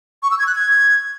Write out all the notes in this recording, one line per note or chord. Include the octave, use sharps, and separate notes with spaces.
C#6
E6
G#6
F#6
G#6